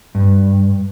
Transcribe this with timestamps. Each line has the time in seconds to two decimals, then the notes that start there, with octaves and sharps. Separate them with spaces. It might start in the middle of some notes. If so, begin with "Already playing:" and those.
0.15 G2